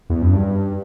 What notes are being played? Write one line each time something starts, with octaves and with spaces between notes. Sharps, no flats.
E2
F#2
G2